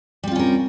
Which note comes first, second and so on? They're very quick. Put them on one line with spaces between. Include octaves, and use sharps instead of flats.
G3 C4 F4 C#4 A#4